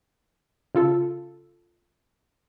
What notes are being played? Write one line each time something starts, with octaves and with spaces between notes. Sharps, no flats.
C#3 F4 A4